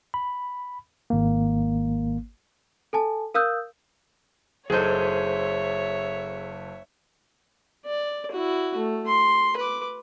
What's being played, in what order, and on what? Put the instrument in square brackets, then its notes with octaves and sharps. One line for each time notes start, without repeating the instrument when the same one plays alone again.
[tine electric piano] B5
G#1 A#3
[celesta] A4 G#5 A5
A#4 F5 D#6 E6 F#6 G6
[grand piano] F#1 A4 [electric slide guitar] G#4 C5 [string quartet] C#5 E5
[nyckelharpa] D5
E4 F#4
A3
C6
B4 D6